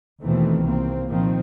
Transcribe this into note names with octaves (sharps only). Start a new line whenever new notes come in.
D#2 B2 D#3 E3 A3 C4
C2 A#3 C4
A#2 D#3 F3 C4